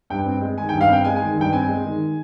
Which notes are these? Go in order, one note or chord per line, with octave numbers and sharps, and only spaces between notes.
G2 G5
C4
G#3
D#3 G#5
G2 G5
F5
C4 G5
G#3 G#5
D#3 G#5
G2 G5
C4 G#5
G#3
D#3